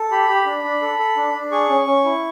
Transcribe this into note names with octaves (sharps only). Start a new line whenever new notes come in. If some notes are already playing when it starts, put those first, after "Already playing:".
Already playing: A4
G4 B5
G4
D4
D4
A4
A4
D4
D4
G#4 C#6
C#4
C#4
E4